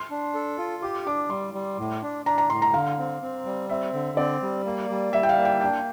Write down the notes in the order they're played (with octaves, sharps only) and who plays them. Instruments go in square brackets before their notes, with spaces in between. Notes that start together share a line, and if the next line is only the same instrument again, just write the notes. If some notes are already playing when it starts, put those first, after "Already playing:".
Already playing: [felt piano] C6
[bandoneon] D4
A4
F4
[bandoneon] G4 [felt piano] D6
[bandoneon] D4 [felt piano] D6
[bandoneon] G3 [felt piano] C6
[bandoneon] G3
A2
D4
[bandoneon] D4 [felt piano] A#5
[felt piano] A#5
[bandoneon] A2 [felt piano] C6
[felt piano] A#5
[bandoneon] D3 [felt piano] F5
[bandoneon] C4
C4
G3
[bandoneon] C4 [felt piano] E5
[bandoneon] D3
[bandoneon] C4 [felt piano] D5
[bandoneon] G3
A#3
G3
[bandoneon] G3 [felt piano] E5
[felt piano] G5
F5
[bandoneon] A#3
[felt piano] G5
[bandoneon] D4 [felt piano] G5